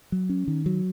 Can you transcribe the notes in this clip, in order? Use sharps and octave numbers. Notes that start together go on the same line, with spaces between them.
F#3
C#4
D#3
F#3